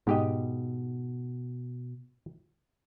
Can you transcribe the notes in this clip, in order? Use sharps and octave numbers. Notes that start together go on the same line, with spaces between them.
G#2 B2 G4 D#5